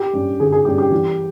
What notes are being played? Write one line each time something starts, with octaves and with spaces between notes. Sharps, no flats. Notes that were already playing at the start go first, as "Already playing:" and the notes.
Already playing: G4
G2 G3 C#4
G1 G#4
G#4
G2 G3 C#4 G4
G4
E2